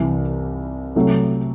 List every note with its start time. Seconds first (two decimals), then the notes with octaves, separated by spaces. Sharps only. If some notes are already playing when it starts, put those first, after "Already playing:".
Already playing: C2 C3 E3
0.95 C3 F#3 A3 E4